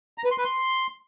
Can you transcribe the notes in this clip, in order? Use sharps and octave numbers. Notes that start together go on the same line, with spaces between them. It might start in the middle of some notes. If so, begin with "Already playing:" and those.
A#5
B4
C6
B4
C6